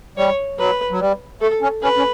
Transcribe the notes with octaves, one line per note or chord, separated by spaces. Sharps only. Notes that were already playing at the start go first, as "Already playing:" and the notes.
G3 C#5
F#3 B4
F#3
G3
A3 A4
C#4
C#4 B4
C#4